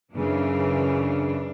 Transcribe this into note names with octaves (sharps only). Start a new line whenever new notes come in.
F#2 C#3 E3 D4